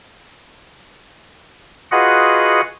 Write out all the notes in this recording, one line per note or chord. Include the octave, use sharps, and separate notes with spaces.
F4 F#4 G#4 B4 D#5 F#5